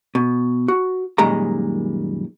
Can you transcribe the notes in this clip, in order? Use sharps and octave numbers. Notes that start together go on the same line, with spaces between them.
B2
F#4
F#2 A#2 D#3 G3 G#3 A#5